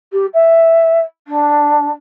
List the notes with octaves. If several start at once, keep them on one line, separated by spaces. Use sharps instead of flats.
G4
E5
D4